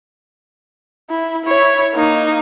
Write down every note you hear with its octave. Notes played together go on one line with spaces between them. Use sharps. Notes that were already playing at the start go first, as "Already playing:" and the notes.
E4
E4 C#5
A#3 D#4